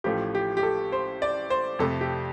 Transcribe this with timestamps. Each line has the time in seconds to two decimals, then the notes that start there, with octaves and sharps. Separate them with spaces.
0.04 A1 A2 F3 A3 G4
0.35 G4
0.57 G4
0.63 A4
0.92 C5
1.22 D5
1.50 C5
1.79 F2 C3 A3 A4
2.01 G4